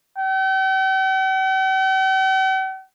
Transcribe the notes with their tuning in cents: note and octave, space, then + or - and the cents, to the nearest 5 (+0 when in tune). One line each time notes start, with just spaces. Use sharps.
G5 -45